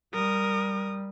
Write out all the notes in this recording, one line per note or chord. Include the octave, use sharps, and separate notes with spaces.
G3 A#4 D#6